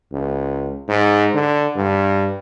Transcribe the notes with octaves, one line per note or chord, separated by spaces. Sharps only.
C#2
G#2
D3
G2